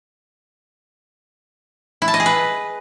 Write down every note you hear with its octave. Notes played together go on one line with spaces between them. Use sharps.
E4
A5
D#5
G#4
B4